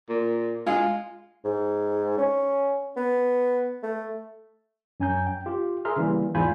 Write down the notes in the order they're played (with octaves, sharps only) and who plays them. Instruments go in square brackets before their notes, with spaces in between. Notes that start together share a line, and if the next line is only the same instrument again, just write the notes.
[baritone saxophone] A#2
[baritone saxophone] G#3 [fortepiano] F4
[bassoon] G#2
C#4
B3
A3
[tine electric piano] F#2 C#4 G#5 A#5 G6
G5
F4 G4
G#4 A#4 E5 A#5 C6 F6
C#3 E3 G3 A#3
E2 G#2 F4 G#5 B5 G6